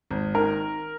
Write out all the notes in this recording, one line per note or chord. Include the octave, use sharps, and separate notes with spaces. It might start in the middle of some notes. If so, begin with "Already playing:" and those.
G#1
D#3 A#4